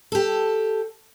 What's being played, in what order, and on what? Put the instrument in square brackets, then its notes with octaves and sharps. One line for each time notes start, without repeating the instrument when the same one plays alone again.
[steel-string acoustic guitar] G4 A4